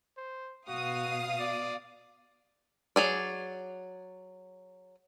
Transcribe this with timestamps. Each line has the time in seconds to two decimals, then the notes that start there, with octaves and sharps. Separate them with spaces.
0.17 C5
0.68 B2 F#4 F5 D#6
1.40 D5
2.96 F#3 G#4 D5